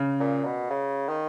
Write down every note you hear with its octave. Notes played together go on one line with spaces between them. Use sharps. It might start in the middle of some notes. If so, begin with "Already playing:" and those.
Already playing: C#3
A#2
B2
C#3
D#3